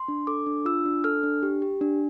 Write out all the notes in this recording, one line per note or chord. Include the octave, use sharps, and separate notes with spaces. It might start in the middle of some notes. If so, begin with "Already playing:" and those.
Already playing: C6
D4
A4 D6
D4
F4 E6
D4
A4 F6
D4
G4
G4
D4